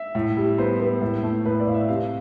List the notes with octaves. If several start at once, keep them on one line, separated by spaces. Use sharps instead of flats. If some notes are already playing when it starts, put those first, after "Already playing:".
Already playing: E5
A2
G3
B3 C5
B3
A2
A3
A2 B4
D5
A2 F5
E5
C3 F5